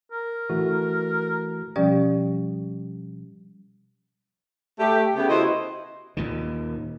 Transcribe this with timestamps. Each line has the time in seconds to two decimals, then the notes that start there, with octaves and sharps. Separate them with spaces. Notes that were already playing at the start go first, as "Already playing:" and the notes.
0.12 A#4
0.49 E3 A3 F#4
1.76 B2 F3 G3 C#4 G4 D5
4.80 A3 G4
5.15 C#3 A3 B3 G4
5.29 E4 F#4 C5 D#5
6.17 D#2 A#2 D#3